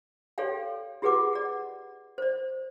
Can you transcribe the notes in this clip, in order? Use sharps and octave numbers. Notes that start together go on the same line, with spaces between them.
G4 A4 C#5 D5 F5 G5
F4 G4 G#4 B4 F#5 D6
D5 F#5
C5 D5